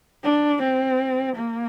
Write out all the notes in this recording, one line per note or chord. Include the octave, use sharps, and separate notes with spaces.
D4
C4
A#3